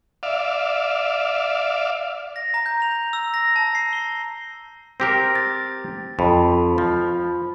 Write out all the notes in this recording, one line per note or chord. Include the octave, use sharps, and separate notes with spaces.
D5 E5 F5
A#6
A#5
G6
F7
E6
A#6
A5
C7
G7
C4 G4 A#4 A#6
A6
F2 B5
F3